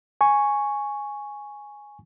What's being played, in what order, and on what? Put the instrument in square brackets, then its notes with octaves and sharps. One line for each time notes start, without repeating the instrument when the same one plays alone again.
[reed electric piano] G#5 C#6